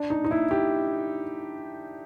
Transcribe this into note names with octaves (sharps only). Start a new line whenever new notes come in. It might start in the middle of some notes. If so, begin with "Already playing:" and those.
Already playing: D4
D#4
D#4
E4
G4